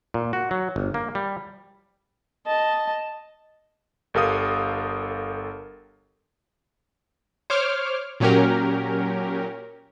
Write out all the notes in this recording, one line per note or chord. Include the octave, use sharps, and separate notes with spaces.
A#2
F#4
F#3
G1
A#3
G3
D#5 A5
G1 G4 A4 A#4 F5 D#6
C5 C#5 D6 F6
A#2 F#3 C#4 G4 A#4